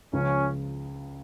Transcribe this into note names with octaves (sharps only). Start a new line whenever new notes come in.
C#2 C#3 F3 C#4